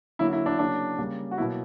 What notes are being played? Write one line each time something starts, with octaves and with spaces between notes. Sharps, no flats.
D3 F#3 A#3 E4
E4
D4
C#3 F#3 A#3 D4
C#3 G3 A#3
F#4
B2 F#3 A#3 E4